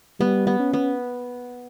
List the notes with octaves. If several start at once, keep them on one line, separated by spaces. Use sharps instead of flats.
G3 B3
B3
C#4
B3